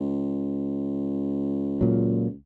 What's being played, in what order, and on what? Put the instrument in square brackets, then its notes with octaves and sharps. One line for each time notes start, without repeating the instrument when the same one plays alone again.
[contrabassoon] C#2
[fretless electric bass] A#2 F#3